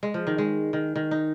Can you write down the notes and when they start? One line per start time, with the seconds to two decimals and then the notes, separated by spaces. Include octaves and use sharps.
0.03 G#3
0.14 F3
0.27 D#3
0.38 G#3
0.73 D#3
0.96 D#3
1.11 D#4